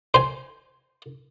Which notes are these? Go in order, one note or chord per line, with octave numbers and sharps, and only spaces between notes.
C5 G#5